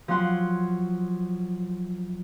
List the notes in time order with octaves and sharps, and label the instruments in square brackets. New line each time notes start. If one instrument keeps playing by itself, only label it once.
[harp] F3 F#3 C#4 F#5 C6